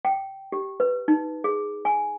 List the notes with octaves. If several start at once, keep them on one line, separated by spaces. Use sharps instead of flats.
G5
G4
B4
D#4
G#4
G#5